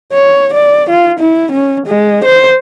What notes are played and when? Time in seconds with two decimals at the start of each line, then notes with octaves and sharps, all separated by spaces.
0.13 C#5
0.54 D5
0.90 F4
1.19 E4
1.52 C#4
1.87 G#3
2.25 C5